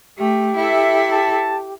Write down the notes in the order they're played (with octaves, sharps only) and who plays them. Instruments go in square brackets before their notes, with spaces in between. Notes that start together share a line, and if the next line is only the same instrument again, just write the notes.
[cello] A3 [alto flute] G4
[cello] E4 A4 [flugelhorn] E5
[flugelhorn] A5